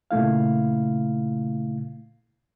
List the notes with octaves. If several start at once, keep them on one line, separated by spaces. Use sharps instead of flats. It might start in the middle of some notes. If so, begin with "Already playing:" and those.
A#2 C#3 A3 E4 F5